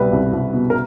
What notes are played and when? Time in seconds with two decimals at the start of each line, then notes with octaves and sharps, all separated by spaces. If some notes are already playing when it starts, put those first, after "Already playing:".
Already playing: C2 B2 G3 B4
0.12 C2
0.33 C2
0.53 B2
0.70 A#4